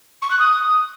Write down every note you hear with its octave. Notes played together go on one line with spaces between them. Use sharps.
C#6
F#6
D#6